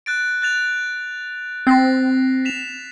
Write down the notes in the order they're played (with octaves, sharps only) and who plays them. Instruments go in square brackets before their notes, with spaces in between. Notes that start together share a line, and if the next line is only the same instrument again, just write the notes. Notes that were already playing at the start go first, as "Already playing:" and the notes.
[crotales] F#6 A6 D7
F#6 A6 F7
[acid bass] C4 [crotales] A6 A#6 C7
[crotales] B6 E7 F7